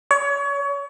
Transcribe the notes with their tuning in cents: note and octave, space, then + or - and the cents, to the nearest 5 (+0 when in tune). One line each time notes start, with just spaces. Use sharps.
C#5 +30